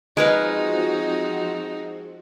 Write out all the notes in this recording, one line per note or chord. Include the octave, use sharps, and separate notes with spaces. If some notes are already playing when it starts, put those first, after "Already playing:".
F3 G#3 C4 D#4 F#4 A#4 B4 F5